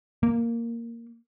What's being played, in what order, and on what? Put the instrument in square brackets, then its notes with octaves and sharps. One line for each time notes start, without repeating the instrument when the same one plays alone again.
[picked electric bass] A#3